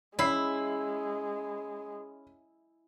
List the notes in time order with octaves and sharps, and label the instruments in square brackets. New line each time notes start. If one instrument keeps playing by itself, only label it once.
[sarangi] G#3 [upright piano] C#4 B5 C7 [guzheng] E4